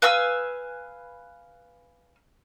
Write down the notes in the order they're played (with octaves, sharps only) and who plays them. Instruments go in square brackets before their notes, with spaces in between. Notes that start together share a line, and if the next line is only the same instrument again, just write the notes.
[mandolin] B4 F5 G#5 E6